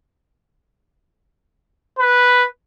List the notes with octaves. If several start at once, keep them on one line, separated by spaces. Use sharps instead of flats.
B4